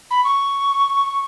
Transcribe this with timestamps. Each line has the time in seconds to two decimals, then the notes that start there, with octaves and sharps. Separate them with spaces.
0.11 B5
0.24 C#6